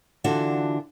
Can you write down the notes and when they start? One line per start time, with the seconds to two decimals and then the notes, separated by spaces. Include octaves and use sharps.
0.24 D3 E3 D4 F4 F#4